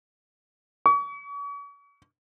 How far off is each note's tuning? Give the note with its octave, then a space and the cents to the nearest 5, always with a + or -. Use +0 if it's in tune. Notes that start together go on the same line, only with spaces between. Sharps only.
C#6 +40